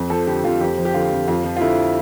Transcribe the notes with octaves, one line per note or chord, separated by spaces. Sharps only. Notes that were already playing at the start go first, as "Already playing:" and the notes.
Already playing: F2
F3 A4
D3 G4
F2 F4
F2 G4
F3
G4
D3 F4
F2
F2 F4
F3
F4
D3 E4